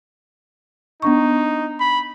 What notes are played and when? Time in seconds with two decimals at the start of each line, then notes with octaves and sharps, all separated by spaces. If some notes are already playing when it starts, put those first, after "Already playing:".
1.02 B3 D4 D#4 C#6
1.80 B5